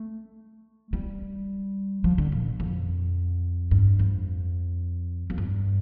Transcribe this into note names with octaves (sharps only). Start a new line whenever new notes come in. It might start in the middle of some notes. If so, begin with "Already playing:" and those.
Already playing: A3
G3
F3
D3
A#2
F2
G2
F2
F2
G2